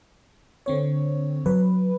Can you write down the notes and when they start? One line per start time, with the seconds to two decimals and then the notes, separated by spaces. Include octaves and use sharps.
0.66 D3 C4 C#5
1.46 F#3 B4